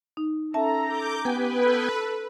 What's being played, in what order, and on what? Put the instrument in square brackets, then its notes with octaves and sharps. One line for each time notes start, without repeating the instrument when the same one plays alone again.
[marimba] D#4
[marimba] C#4 E5 A5 [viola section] A4 A#5
[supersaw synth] D6 G6
[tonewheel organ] B3 G5 G#5 [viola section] G4 [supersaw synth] B4
[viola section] A4